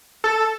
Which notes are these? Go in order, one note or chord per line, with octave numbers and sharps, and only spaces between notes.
A4